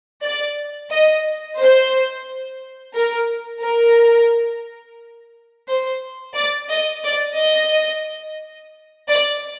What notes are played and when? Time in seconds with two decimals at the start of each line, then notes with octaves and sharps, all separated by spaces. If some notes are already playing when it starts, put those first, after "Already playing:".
0.22 D5
0.90 D#5
1.58 C5
2.95 A#4
3.63 A#4
5.68 C5
6.36 D5
6.70 D#5
7.04 D5
7.38 D#5
9.08 D5